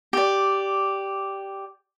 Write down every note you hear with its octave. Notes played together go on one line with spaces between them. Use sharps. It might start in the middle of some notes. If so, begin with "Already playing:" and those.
G4 D5